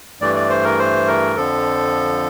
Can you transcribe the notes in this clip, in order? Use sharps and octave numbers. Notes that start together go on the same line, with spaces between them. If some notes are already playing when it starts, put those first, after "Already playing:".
G2 E3 A3 D5
D5
C5
A#4
C5
A#4
F2 D3 F3 A4